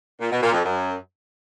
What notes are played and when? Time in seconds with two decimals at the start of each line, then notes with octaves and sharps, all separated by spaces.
0.20 A#2
0.31 B2
0.42 A#2
0.53 F2
0.64 F#2